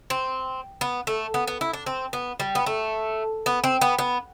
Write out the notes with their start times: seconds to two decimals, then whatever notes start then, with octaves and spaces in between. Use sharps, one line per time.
0.10 C4
0.81 B3
1.07 A3
1.34 B3
1.47 B3
1.61 E4
1.73 D4
1.86 C4
2.13 B3
2.40 G3
2.55 B3
2.66 A3
3.46 B3
3.64 C4
3.81 B3
3.99 B3